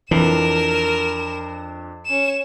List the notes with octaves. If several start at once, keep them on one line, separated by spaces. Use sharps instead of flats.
F2 E3 D4 A#4 C7 E7
C#4 E7